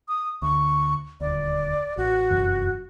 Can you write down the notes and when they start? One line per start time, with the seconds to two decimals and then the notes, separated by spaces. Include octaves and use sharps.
0.08 D#6
0.42 D2 C#6
1.21 D#1 D2 D5
1.97 A1 F#4
2.31 F1 F#2 E3